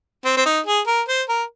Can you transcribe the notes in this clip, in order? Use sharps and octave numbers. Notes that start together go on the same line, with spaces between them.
C4
C4
D#4
G#4
A#4
C5
A#4